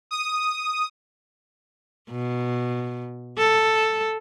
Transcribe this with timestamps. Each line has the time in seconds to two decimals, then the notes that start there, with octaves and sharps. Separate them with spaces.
0.11 D#6
2.10 B2
3.38 A4